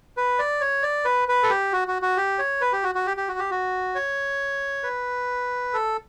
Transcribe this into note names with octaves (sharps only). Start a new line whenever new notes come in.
B4
D5
C#5
D5
B4
B4
A4
G4
F#4
F#4
F#4
G4
C#5
B4
G4
F#4
F#4
G4
G4
F#4
G4
F#4
C#5
B4
A4